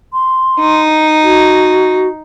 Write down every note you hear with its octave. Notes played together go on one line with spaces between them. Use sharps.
C6
D#4
F#4